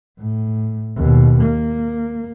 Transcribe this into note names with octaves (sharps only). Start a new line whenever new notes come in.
A2
D#2 B2
A#3